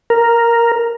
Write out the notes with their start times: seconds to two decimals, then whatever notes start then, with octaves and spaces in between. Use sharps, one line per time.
0.10 A#4